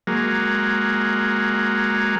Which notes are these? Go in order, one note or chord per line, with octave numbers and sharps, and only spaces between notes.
F#3 G#3 A#3